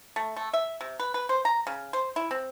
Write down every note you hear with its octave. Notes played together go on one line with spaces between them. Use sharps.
A3
A3
E5
C3
B4
B4
C5
A#5
C#3
C5
E4
C4